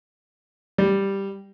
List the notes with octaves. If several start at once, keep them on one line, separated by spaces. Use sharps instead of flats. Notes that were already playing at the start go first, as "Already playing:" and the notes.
G3